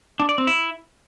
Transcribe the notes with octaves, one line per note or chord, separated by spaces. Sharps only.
D4
D5
C4
E4